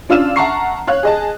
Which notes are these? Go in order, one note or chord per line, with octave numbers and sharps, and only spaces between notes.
C#4 D4 F4 E6 F6 E7
E5 F#5 A5 A#5 C#6 C7
C#5 F5 F#6
G#4 D#5 A5